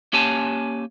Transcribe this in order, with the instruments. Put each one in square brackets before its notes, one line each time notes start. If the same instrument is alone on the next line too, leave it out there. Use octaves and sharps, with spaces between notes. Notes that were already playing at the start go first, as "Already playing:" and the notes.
[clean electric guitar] A#3 C#4 G4 C#5 G#5 A5